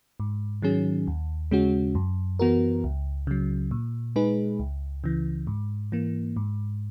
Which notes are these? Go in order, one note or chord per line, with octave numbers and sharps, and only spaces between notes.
G#2
D#3 F#3 C#4 G#4
D#2
C#3 G#3 C#4 F#4
F#2
E3 B3 F#4 A#4
C#2
C#3 F#3
A#2
G#3 D#4 G#4 B4
C#2
C#3 E3
G#2
E3 A#3
G#2